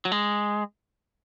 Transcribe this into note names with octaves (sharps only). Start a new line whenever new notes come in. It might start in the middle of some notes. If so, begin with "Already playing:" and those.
F#3
G#3